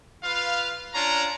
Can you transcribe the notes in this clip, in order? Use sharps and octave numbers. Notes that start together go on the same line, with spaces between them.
F4 B4 F5
C#4 D4 F4 C#5 A#5